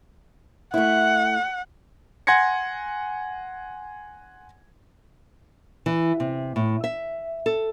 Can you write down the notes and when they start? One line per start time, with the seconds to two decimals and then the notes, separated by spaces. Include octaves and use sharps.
0.74 A3 E4 F#5
2.27 F#5 G#5 C6 G#6 A#6 C#7
5.86 E3
6.20 C3
6.56 A2
6.84 E5
7.46 A4